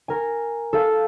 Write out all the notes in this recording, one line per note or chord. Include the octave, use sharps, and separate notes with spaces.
A#4 G#5
A4 F5